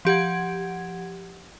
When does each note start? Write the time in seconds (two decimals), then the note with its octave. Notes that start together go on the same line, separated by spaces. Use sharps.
0.05 F3 G4 F#5 G#6